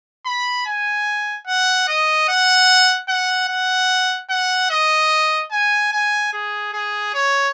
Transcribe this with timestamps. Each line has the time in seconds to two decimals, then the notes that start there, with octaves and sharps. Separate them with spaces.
0.25 B5
0.66 G#5
1.47 F#5
1.88 D#5
2.28 F#5
3.09 F#5
3.49 F#5
4.30 F#5
4.70 D#5
5.51 G#5
5.92 G#5
6.33 G#4
6.73 G#4
7.14 C#5